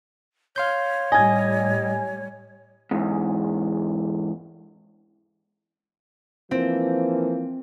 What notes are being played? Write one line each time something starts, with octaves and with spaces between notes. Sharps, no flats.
C#5 F5 C6 G6
A2 G3 D#5 G#5 G#6
E2 G#2
E3 F3 A#3 C4